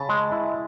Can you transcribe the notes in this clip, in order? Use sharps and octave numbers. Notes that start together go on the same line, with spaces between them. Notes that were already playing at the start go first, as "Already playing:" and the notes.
Already playing: C#3 A5 B5
G#3
E4